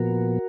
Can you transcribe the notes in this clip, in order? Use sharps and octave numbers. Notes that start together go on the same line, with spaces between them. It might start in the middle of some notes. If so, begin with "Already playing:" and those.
Already playing: A#2 F3 B3 F#4 A#4